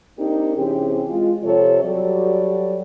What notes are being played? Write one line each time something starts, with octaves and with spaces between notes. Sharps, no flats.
A#3 C4 D4 D#4 G4 A#4
C3 E3 C4 C#4 G4 G#4
G#3 F4
C3 F3 G4 A4 C#5
F#3 G3 F#4 G4 A4 D5